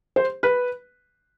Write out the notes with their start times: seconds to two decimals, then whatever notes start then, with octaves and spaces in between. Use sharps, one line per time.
0.16 C5
0.43 B4